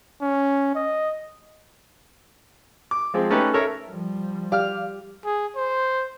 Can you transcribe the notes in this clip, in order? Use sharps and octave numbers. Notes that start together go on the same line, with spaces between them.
C#4
D#5
D6
F3 G#3 C4
A3 C#4 D#4 G4 A4 B4
A4 A#4 C#5 E5
F3 G3
G4 D5 F5 F6
G#4
C5